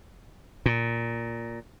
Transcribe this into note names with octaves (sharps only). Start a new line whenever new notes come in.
A#2